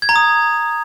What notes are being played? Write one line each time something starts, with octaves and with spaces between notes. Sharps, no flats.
G#6
A#5
D#6